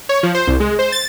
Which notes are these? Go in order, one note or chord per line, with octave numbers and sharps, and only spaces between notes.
C#5
F3
C5
C2
G#3
C5
A6